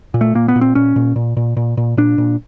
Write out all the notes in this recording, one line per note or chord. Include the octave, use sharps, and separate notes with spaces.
A#2
A3
A#2 A#3
B3
A#2
C4
A#2 C#4
A#2
A#2
A#2
A#2
A#2
A#2 D4
A#2